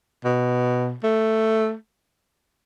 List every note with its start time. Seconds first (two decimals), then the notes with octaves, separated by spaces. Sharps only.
0.25 B2
1.04 A3